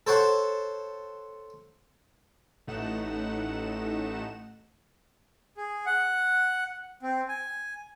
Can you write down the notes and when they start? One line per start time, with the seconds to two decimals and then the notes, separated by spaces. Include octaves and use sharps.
0.07 A4 C5 C#5 F#5
2.67 A1 A2 A3 D#4 F#5 E7
5.57 G#4
5.86 F#5
7.03 C4
7.29 G#5